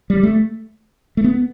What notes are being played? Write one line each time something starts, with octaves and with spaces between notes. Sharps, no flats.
G3
A3
A3
B3